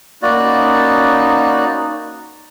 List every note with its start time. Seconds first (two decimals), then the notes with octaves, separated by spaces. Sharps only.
0.22 A#3 C#4 D#4 F#4 D5 B5